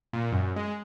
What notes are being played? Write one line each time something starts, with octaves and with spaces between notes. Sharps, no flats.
A#2
F#2
G#3